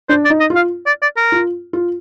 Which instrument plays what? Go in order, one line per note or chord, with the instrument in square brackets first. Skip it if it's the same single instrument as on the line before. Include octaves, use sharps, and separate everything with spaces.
[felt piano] D4 [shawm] C5
[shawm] D5
[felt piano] D#4
[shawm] D#5
[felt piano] F4
[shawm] F5
D5
D5
A#4
[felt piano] F4
F4